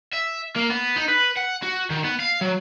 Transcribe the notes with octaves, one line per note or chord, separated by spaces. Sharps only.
E5
A#3
B3
D#4
B4
F#5
F#4
D#3
B3
F5
F#3